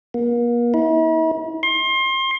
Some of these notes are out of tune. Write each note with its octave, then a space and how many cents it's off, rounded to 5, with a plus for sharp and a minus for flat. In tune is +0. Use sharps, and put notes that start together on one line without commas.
A#3 +40
E4 -45
C6 +30